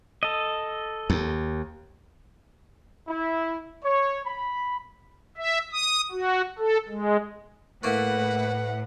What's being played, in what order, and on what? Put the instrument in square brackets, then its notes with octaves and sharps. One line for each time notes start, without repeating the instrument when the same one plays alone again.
[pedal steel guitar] A4 D#5
[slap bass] D#2
[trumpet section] E4
C#5
B5
[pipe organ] E5
D#6
F#4
A4
G#3
[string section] A2 [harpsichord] A3 A#3 [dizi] B4 [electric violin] F#5